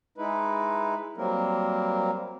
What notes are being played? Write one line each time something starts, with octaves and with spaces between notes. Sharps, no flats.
G#3 D#4 E4 B4
F#3 G3 A#3 C4 A#4